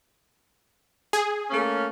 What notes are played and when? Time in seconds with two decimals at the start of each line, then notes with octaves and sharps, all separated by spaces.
1.13 G#4
1.51 A3 A#3 C#4